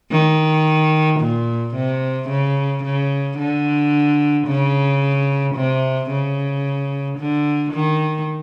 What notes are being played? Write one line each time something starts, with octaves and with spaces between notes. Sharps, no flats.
D#3
A#2
C3
C#3
C#3
D3
C#3
C3
C#3
D3
D#3